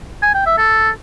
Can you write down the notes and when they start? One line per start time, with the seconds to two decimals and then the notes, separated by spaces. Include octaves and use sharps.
0.23 G#5
0.34 G5
0.46 E5
0.58 A4